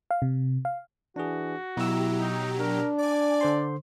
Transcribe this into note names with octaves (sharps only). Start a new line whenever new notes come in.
F5
C3
F5
E3 D4 F#4 G#4
B2 F#3 E4 G4 A#5 E6
D#4
D4 A#4
D5 G#5 D6
D3 C5 C6